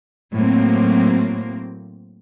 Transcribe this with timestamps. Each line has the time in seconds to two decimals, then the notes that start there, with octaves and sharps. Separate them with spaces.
0.35 A2 F#3 A#3 C4